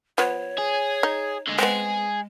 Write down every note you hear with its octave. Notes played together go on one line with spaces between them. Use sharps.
F3 B3 C#5
G#4
D#4
D3 G#3
G#3 B3 C4 G#4